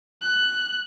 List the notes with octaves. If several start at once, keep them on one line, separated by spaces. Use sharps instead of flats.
F#6